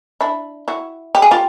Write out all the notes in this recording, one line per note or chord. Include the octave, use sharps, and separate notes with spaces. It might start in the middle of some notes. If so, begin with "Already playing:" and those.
D4 E4
E4 F#4
G4
G#4
F4 G4